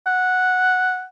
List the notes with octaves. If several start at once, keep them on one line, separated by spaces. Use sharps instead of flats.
F#5